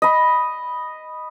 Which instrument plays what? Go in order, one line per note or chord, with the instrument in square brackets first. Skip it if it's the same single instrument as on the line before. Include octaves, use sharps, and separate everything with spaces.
[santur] D#5 B5